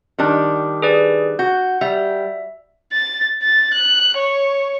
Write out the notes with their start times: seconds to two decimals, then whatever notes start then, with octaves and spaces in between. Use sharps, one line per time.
0.18 D#3 G3 D4
0.82 G#4 B4 D5
1.39 F#4 G6
1.81 G3 E5
2.92 A6
3.42 A6
3.74 F#6
4.17 C#5